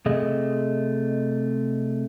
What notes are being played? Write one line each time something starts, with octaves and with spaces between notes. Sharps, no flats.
C3 A3 G#4 D#5